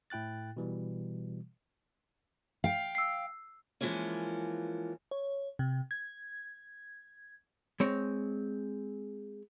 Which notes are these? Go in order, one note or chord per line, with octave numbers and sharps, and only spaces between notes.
A2 E4 G5 F#6 A6
B2 E3 G3
F5 G5
E6 C7
E3 F3 G#3 A#3 C#4
C#5
C3
G#6
G#3 C4 C#5